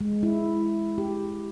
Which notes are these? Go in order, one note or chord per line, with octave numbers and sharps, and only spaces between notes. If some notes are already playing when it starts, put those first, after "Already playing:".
G#3
E4
G4